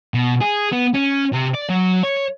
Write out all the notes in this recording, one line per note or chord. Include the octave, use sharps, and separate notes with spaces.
B2
G#4
B3
C#4
C3
D5
F#3
C#5